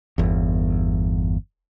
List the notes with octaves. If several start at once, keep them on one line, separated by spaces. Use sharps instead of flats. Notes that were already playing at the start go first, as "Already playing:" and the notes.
G1 E2